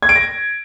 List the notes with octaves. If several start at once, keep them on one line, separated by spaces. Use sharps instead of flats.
G#6
D7
A#6